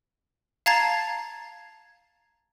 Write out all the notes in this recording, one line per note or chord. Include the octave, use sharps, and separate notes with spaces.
F5 A5 A#5 G#6 A6 C7